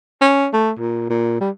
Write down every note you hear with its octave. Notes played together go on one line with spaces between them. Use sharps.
C#4
A3
A#2
A#2
G3